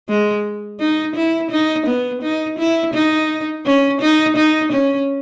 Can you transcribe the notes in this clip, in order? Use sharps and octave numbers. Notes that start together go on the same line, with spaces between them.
G#3
D#4
E4
D#4
B3
D#4
E4
D#4
C#4
D#4
D#4
C#4